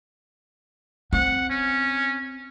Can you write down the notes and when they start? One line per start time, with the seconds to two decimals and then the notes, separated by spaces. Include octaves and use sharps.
1.13 C4 F#5
1.49 C#4